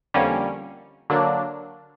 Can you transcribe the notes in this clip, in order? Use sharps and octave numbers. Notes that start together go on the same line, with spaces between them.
F2 D3 G3 A#3 C#4
D3 F#3 A#3 D4